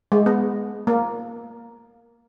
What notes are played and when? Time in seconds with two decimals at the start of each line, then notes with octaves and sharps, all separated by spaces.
0.12 G#3
0.26 B3
0.87 A#3